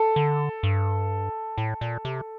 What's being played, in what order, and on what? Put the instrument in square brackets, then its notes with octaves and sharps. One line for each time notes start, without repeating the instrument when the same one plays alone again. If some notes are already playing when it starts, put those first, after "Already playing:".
Already playing: [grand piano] A4
[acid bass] D3
G2
A2
A#2
C3